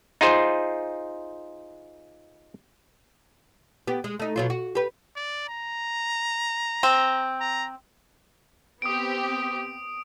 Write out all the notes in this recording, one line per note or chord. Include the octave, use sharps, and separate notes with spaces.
D#4 F4 G#4 C5
B3 G4
G#3
A3 D#4
B2 F#3 F4
F#4
G4 B4
D5
A#5
C4
A#5
B3 C4 G4 D#6 D7